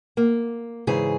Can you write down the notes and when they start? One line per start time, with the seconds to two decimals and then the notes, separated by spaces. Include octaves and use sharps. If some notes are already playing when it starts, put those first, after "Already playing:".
0.17 A#3
0.87 G#2 C#3 E3 G#4